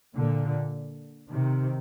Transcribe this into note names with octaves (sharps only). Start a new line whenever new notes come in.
A#2 D3
C3 D#3